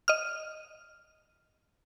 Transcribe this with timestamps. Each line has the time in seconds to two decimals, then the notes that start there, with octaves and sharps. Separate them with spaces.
0.08 D#5 F6